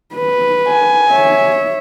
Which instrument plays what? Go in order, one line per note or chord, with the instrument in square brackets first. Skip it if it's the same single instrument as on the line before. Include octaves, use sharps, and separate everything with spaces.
[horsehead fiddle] B4
[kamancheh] G#5
[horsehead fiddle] C#5 E5